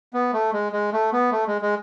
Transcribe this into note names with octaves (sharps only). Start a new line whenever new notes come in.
B3
A3
G#3
G#3
A3
B3
A3
G#3
G#3